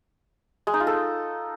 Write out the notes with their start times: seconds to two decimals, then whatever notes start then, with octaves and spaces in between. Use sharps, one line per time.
0.67 G#3
0.74 D#4
0.80 F4
0.87 A4